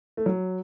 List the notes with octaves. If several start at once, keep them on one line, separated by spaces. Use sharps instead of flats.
A3
F#3